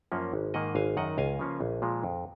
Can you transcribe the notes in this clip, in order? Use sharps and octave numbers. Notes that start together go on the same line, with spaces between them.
F#2 F3 A#3 C#4
G#1
G#2 D#3 A#3 D#5 F#5
G#1 F5 G#5
F#2 D#3 D#5 F#5
C#2 F5 G#5
C#3 F3 A#3 C#4
A#1
A#2 F3 G#3
F2